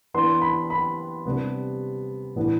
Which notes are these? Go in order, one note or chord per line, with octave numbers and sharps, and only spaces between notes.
E3 B3 D4 C6
B5
B5
C3 G3 B3 D4
A2 E3 B3 D4